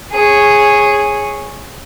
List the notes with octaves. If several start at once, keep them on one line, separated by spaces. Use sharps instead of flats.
G#4 C#5